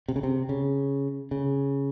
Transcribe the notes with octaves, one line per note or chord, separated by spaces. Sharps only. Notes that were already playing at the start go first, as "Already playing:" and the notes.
C3
C#3
C3
C#3
C#3